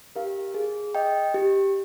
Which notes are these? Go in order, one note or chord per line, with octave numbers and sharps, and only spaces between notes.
G4 A#4 F5
G#4
D#5 G5
G4